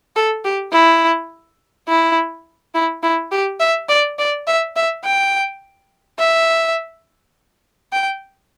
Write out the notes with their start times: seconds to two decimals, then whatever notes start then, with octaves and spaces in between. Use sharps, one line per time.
0.16 A4
0.45 G4
0.72 E4
1.88 E4
2.74 E4
3.03 E4
3.32 G4
3.60 E5
3.89 D5
4.19 D5
4.47 E5
4.76 E5
5.04 G5
6.19 E5
7.93 G5